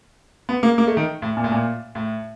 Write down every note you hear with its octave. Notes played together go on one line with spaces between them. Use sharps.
B3
A#3
A#3
A3
D#3
A2
A#2
A2
A#2
A2